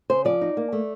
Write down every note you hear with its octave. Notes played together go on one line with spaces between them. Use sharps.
C#3 C5
F3 D5
D#4
A#3
A3